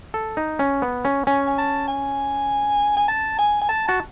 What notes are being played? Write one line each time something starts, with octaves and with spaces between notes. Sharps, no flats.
A4
D#4
C#4
B3
C#4
C#4 G#5
G#5
A5
G#5
G#5
A5
G#5
G#5
A5
F#4 A5